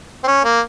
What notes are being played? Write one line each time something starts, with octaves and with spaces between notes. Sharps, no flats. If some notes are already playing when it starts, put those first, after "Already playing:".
C4
C#4
A#3